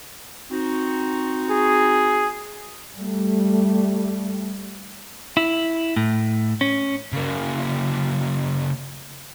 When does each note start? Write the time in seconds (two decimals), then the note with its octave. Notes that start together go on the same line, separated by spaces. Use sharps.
0.51 C4 D#4 F#4
1.50 G#4
2.96 G3 A3
5.37 E4
5.96 A2
6.61 C#4
7.13 C#3 A#3